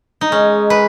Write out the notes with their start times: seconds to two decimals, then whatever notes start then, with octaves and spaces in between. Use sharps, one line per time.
0.21 D#4
0.32 G#3 C#4
0.70 B4